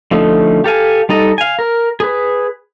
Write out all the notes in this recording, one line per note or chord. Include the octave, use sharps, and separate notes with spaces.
D3 F3 A3 C#4 D#4
G4 A4 F5 G#5
G3 D#4 A4 D#5
F5 G#5
A#4
G#4 B4